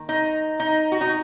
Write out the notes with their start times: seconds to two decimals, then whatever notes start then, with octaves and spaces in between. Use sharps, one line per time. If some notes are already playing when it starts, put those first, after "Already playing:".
Already playing: D#3 A#3
0.09 D#4
0.60 D#4
0.92 F#4
1.01 D#4